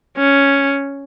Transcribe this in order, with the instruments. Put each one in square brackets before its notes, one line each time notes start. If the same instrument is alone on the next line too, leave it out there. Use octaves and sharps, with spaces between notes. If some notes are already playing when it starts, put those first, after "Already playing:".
[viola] C#4